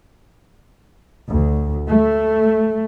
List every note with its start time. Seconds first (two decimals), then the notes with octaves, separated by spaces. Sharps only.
1.29 D2
1.87 A3